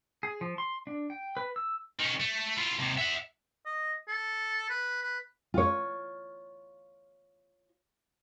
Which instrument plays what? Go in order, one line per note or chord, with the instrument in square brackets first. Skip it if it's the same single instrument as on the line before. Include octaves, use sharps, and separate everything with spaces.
[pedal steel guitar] G#4
F3
C6
D4
G5
B4
E6
[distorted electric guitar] D#3 C#4
A3
E4 F4
D#2 C3
E5 F#5
[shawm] D#5
A4
B4
B4
[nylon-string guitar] F4 C#5